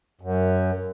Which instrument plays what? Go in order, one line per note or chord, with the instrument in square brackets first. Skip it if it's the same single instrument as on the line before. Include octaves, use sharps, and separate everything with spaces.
[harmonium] F#2